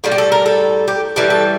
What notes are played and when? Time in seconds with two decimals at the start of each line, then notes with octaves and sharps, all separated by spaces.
0.04 A2 G3 F4
0.12 G4
0.18 A4
0.32 A#4
0.46 A4
0.88 G4
1.16 A2 E3 G3 G4
1.30 A4